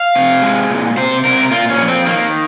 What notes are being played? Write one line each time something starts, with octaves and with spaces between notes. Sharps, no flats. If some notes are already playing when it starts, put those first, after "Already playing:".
Already playing: F5
C3
G#3
A#2
C3 C5
C3 A#4
A#2 F4
C#4
F3
C4
D#3 A#3